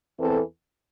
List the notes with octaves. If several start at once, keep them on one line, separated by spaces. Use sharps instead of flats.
E2 E3 C4 A4